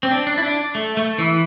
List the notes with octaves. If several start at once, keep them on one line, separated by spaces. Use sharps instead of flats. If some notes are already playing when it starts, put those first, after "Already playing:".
C4
D4
D4
E4
D4
A3
A3
E3